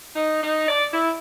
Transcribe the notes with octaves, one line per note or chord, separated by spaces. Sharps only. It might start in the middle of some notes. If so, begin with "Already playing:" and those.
D#4
D#4
D5
E4